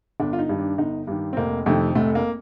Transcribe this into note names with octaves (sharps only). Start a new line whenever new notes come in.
G1 D4
F4
D#4
G2 D#3
D4
G1 D#4
G2 D#3 D4
C4
F1 A#3
F2 C3 D#3 A3
F1 A3
A#3